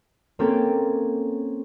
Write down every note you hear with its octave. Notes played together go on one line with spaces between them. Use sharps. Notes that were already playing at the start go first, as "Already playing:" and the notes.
A#3 C4 C#4 G4 A4